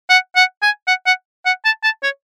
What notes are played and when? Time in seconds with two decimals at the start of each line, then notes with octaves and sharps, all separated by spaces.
0.10 F#5
0.36 F#5
0.62 G#5
0.87 F#5
1.06 F#5
1.46 F#5
1.65 A5
1.84 A5
2.03 C#5